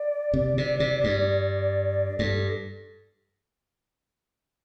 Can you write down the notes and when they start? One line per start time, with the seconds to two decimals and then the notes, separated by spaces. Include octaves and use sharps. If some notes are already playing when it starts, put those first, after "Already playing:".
Already playing: D5
0.34 C3
0.58 C3
0.80 C3
1.04 G2
2.19 G2 A4